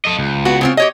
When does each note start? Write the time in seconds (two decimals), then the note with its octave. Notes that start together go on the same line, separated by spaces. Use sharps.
0.05 A4 D#5
0.19 C#2
0.45 B3 F#4
0.61 C#3 C4 F4
0.77 G4 C#5 D#5